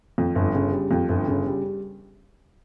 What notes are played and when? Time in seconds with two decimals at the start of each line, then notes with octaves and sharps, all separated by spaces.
0.18 F2
0.35 G1
0.55 C#3
0.72 G3
0.91 F2
1.09 G1
1.28 C#3
1.46 G3